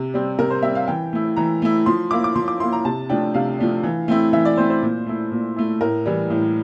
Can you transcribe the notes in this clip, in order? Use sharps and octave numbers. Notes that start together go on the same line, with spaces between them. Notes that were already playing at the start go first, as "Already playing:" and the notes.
Already playing: C3
G3 C4
C3 A#4
C5
G3 C4 E5
F5
E3 G5
A3 E4
E3 A#5
A3 E4
F3 C6
A#3 E4 D6
D6
F3 C6
D6
A#3 E4 C6
A#5
C3 A5
F3 A3 D4 G5
C3 F5
F3 A3 D4
E3
A3 C4 E4
E3 E5
D5
A3 C4 E4 C5
C5
A#2
A3 E4
A#2
A3 E4
A2 A#4
E3 G3
A2